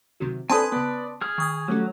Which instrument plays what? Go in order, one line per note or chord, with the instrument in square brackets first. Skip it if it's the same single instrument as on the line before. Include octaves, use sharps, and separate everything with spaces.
[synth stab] C3 D#3 F#3
[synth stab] C4 D4 A4 [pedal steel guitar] B4 G#5 [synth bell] A5 C6 D#6
[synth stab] C#3 B3 [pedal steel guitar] B4 D5
[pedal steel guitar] G#4 F6
[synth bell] D#3 D#6 G#6
[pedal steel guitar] F#3 [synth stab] G3 A3 C#4